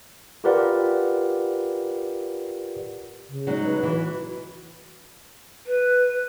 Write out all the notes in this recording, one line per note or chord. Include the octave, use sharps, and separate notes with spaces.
F4 G4 A#4 B4 D5 F#5
C#3
F#3 G#3 D#4
B4
E3
F#4
B4